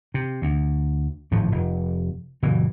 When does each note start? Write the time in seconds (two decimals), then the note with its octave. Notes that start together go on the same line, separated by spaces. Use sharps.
0.14 C3
0.42 D2
1.31 G#1 A2 F3
1.52 F1
2.42 F#1 A#2 E3